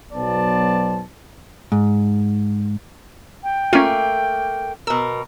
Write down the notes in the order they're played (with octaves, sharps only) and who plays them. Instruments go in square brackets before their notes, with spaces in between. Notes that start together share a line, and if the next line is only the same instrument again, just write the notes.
[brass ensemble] B1 F#3 B3 C5 D5 A5
[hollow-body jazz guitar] G#2
[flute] G5
[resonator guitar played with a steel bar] A3 A#3 [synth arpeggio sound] C#4 F4
[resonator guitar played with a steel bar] B2 A#4 [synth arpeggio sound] E6